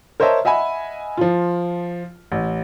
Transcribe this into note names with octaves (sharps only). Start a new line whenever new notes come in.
A#4 C5 C#5 D#5 E5 A5
D#5 E5 F#5 G#5 B5
F3 F4
A1